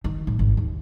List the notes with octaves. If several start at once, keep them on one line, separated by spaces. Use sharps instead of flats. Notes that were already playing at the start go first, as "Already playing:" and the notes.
D#3
A2
G#1
D#2